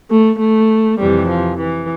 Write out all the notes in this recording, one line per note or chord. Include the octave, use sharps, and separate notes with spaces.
A3
A3
F2 C3 E3 G3
F3
E3